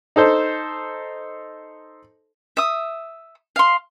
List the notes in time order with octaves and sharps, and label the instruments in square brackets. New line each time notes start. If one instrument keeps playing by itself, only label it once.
[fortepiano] D#4 A4 C5
[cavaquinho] E5 D#6
F5 C6